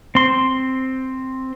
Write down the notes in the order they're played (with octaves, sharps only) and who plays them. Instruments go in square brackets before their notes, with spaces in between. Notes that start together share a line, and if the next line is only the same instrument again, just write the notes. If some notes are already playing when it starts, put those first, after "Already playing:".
[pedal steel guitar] C4 C6